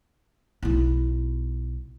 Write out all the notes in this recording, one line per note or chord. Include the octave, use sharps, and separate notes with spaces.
B1 E4